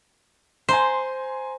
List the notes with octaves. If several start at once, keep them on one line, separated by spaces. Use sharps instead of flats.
C5 G#5 A#5 C6